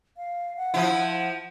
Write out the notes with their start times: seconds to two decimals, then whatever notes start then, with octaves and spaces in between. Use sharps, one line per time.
0.17 F5
0.57 F#5
0.74 F3 E4